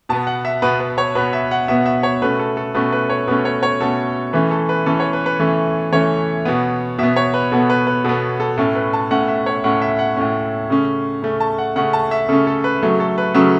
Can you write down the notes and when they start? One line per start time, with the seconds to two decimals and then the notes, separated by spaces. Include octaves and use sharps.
0.09 B2 B3 A5
0.27 F#5
0.45 E5
0.62 B2 B3 B4
0.80 B4
0.98 C#5
1.15 B2 B3 B4
1.33 E5
1.51 F#5
1.68 B2 B3 E5
1.86 E5
2.03 C#5
2.22 B2 A3 C#4 B4
2.39 A4
2.57 A4
2.74 B2 A3 C#4 B4
2.92 B4
3.09 C#5
3.27 B2 A3 C#4 B4
3.45 C#5
3.63 C#5
3.81 B2 A3 C#4 A4
4.33 E3 A3 C#4 B4
4.51 A4
4.69 B4
4.86 E3 A3 C#4 A4
5.00 C#5
5.13 B4
5.26 B4
5.40 E3 A3 C#4
5.92 E3 A3 C#4 C#5
6.45 B2 B3
6.98 B2 B3 E5
7.16 C#5
7.34 B4
7.52 B2 B3 A4
7.70 B4
7.87 B4
8.04 B2 B3 A4
8.40 A4
8.57 A2 A3 C#4 A4
8.75 B4
8.93 A5
9.10 A2 A3 C#4 F#5
9.28 E5
9.46 C#5
9.64 A2 A3 C#4 F#5
9.82 E5
9.99 F#5
10.17 A2 A3 C#4
10.70 C#3 A3 C#4
11.23 C#3 A3 C#4
11.40 A5
11.58 F#5
11.76 C#3 A3 C#4 F#5
11.93 A5
12.11 E5
12.29 C#3 A3 C#4 A4
12.47 A4
12.64 B4
12.82 C#3 F#3 A3 C#4
13.00 A4
13.18 B4
13.34 C#3 F#3 A3 C#4 E5